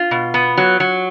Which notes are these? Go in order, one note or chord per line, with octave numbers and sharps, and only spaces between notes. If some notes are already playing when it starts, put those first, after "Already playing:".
Already playing: F4
B2
B3
F#3
F#3